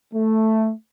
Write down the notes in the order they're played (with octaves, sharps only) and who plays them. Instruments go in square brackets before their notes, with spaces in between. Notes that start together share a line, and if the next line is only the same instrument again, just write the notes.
[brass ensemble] A3